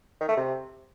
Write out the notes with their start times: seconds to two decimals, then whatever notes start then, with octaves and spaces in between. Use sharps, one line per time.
0.20 D#3
0.29 A3
0.37 C3